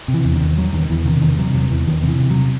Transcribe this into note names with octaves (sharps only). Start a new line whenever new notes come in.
C3
E3
E2
D#3
E2
E2 F#3
E2 D#3
E2 E3
C3 D#3
E2 D#3
C3 F#3
E2 F#3
E2 E3
E2 D#3
C3
E3
C3
C3 F#3